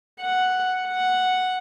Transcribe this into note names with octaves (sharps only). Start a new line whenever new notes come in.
F#5
F#5